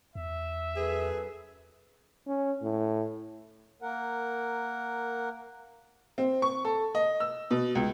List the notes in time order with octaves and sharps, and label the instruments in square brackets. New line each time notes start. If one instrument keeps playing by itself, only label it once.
[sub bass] E2 [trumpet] E5
[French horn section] F#2 A4 B4 [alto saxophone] G#4
[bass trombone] C#4
A2
[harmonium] A#3 A#4 F#5
[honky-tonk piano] C4
C#6
A4
D#5
E6
B2
C#2